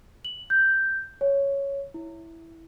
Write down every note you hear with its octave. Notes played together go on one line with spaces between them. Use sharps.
F#7
G6
C#5
E4